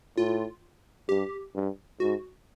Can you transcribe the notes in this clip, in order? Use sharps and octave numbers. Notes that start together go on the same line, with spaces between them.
A2 F4
G2 G4
G2
G#2 F#4